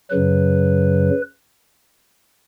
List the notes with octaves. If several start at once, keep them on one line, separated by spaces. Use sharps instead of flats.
F#2 C#3 F#3 B4